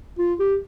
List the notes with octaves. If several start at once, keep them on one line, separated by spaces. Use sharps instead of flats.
F4
G4